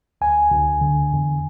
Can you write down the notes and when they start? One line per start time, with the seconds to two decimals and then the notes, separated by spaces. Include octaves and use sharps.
0.21 D2 G#5
0.51 D2
0.81 D3
1.13 E2